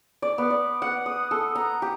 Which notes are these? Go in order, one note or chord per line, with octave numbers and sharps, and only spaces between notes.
D5
B3
D5
F#5
D#6
A4
A#5
G4